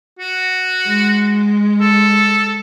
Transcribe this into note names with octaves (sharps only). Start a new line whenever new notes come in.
F#4
G#3
A4